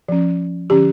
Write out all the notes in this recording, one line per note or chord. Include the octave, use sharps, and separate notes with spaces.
F3 C#4
D3 F3 C#4 G4